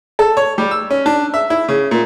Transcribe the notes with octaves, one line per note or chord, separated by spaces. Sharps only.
A4
C#5
G3
E6
C#4
D4
E5
E4
C#3
A#2